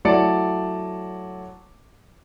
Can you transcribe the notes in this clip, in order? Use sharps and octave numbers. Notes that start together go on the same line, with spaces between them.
F#3 A3 E4 D5 A5 C#7